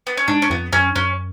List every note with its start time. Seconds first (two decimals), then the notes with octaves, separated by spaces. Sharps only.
0.07 B3
0.17 C#4
0.28 G#2 D4
0.42 C#4
0.50 F2 B3
0.73 F#2 C#4
0.96 F#2 C#4